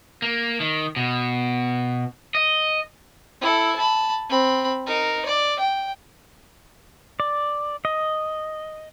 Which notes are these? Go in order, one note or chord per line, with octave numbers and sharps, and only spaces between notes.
A#3
D#3
B2
D#5
E4 A4
A5 B5
C4 B5
D#4 A#4
D5
G5
D5
D#5